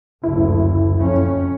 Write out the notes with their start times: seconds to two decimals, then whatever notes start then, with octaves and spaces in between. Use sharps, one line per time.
0.23 F#1 D2 E4
0.99 F2 C#4